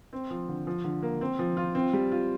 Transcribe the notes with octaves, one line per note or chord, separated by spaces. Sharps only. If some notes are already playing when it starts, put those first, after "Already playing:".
C4
F3
D3
F3
D3
A#3
C4
F3
F4
C4
G3
F4